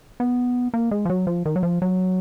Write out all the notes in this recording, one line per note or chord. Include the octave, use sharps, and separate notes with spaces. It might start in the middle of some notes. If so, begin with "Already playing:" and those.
B3
A#3
G#3
F3
F#3
F3
D#3
F#3
F3
F#3